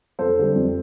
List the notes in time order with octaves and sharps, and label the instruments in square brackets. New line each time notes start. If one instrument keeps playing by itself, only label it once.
[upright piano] F2 A4 C5
D3 G3
F2